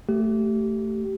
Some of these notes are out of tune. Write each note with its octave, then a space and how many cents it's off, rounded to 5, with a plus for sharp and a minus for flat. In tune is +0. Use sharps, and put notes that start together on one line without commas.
A3 +10 G4 -20